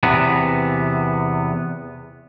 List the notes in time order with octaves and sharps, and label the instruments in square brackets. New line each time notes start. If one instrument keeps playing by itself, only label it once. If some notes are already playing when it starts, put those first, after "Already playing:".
[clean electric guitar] E2 C3 B3